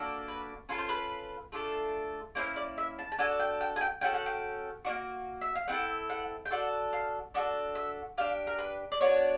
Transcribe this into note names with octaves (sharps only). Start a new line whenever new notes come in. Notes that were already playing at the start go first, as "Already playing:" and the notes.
Already playing: A#3 D4 F#4 A4
B4
C#4 F4 A4 B4
C5
B4
A3 D4 F4 A4
A#3 C#4 E4 C5
D5
E5
A5
A5
D4 F#4 A4 G#5
G5
G5
G#5
G5
C#4 F#4 A4 G5
F#5
G5
A#3 D4 F#4
E5
F5
C4 E4 A4 F#5
F#5
G5
D4 F#4 A4 F#5
F5
D4 F#4 A4 D#5
E5
D4 G4 F5
A#4
B4
D5
B3 D4 F#4 C#5